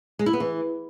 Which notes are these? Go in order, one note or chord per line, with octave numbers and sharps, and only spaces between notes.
G#3
E4
B3
E3